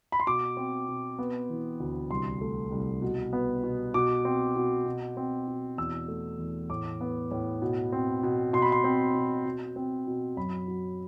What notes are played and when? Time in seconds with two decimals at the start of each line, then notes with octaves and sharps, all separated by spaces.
0.12 B5
0.20 C6
0.27 B2 D6
0.57 C4
0.88 B2
1.19 B3
1.50 E3
1.80 D2
2.10 C2 C6
2.41 A3
2.72 C2
3.02 B2
3.33 B3
3.63 B2
3.94 B2 D6
4.25 C4
4.56 B2
4.86 B2
5.17 C4
5.48 B2
5.78 E2 E6
6.08 A3
6.39 E2
6.70 A2 D6
7.01 B3
7.31 A2
7.62 B2
7.92 C4
8.23 B2
8.53 B2 C6
8.62 B5
8.72 C6
8.84 C4
9.15 B2
9.45 B2
9.76 C4
10.07 B2
10.37 F#2 B5
10.68 F#3